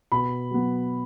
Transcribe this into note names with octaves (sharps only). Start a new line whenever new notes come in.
B2 B5
F#3 B3